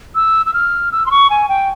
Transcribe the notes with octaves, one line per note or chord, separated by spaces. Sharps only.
E6
E6
F6
E6
C6
C#6
G#5
G5